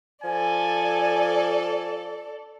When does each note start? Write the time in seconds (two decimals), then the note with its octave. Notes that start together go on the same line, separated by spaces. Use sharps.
0.24 F3 A4 D5 G#5